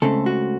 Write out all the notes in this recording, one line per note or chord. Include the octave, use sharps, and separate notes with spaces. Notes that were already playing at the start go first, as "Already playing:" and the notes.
C#2 C#3 A3 C4 A4
F#4